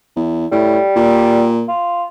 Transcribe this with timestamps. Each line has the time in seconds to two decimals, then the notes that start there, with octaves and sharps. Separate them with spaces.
0.16 E2
0.52 A2 G3
0.96 A#2
1.68 F4